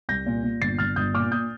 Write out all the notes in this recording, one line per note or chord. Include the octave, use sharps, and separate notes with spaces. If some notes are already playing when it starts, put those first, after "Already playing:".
C2 G6 A#6
A#2
A#2
G1 A6 C7
G1 F6 A6
G1 D#6 G6
A#2 D6 F6
A#2 D#6 G6